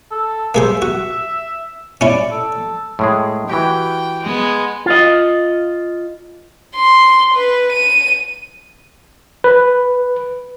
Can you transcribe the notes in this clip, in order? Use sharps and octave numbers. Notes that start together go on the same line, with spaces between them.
A4
A#3 G#4 C5 E5
F#4
C#4 E4 D5
A4
A2 G#3 G#4
E3 F#4 G4 G5
G#3 B3
F4 D#5
C6
B4
D#7
B4